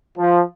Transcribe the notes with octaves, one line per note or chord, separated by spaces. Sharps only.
F3